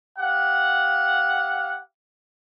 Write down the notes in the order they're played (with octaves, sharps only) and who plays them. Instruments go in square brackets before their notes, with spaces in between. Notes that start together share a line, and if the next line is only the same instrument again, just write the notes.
[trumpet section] G4 F5 F#5